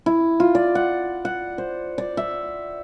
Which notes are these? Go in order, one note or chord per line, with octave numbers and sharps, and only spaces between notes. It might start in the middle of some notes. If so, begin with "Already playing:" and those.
E4
F4
D5
F#5
F#5
C5
D5
E5